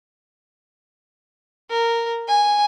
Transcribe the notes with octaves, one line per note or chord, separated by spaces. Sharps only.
A#4
G#5